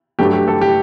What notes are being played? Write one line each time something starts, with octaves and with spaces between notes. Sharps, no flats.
G2 F#3 A3 G4
G4
A4
G4